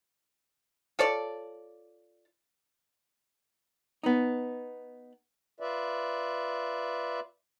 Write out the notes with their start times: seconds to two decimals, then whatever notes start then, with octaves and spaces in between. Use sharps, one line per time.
0.99 F4 A4 C#5 D5
4.03 B3 D#4
5.60 F4 B4 D5 E5